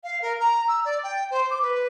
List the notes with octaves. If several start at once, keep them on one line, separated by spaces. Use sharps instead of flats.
F5
A#4
A#5
E6
D5
G5
C5
D6
B4